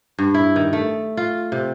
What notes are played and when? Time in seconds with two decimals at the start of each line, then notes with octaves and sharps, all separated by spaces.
0.19 G2
0.34 E4
0.56 D#3
0.73 A3
1.17 F4
1.52 C3